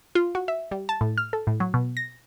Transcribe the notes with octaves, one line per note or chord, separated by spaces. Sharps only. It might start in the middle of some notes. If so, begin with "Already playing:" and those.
F4
F#4
E5
G3
A5
A2
F6
A4
A2
F#3
B2
A#6